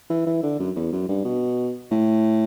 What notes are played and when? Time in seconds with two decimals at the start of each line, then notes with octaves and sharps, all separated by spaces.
0.10 E3
0.26 E3
0.43 D3
0.59 F#2
0.76 E2
0.92 F#2
1.09 G2
1.25 B2
1.91 A2